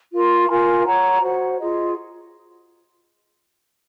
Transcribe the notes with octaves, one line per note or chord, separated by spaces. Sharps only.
F4 A#4 F5 C6
F4 A#4 F5 G#5
G#4 C#5 F#5 A#5
F#4 C5 F#5
F4 G#4 D#5